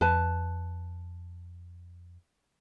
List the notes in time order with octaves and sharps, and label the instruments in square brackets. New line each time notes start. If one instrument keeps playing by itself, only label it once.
[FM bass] F2 [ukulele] B4 A5